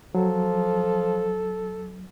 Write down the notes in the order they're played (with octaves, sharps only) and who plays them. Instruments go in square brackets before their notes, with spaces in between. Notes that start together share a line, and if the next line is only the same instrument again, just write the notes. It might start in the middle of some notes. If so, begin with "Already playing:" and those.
[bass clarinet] F3 [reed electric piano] F#3 [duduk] A4